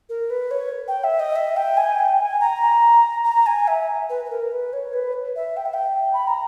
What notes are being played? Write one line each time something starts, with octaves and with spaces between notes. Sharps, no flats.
A#4
B4
C#5
G5
E5
D#5
E5
G5
G#5
G5
G#5
A#5
A#5
G#5
E5
B4
B4
A#4
B4
C#5
B4
E5
G5
E5
G5
B5
A#5